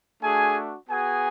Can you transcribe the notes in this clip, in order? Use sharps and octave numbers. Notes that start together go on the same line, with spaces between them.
A3 D4 F#4 G#4 G#5
B3 F#4 G#4 G#5